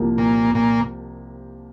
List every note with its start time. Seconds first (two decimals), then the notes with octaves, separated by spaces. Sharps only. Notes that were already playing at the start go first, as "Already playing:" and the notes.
Already playing: C2 C3 F3 A#3
0.18 A#2
0.55 A#2